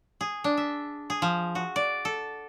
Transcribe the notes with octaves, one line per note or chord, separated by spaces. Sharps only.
G#4
D4
E5
G#4
F3
F#4
D5
A4